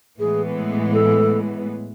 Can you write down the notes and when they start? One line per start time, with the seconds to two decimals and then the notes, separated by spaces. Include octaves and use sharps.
0.19 A2 E3 G#3 B3 G#4
0.93 A4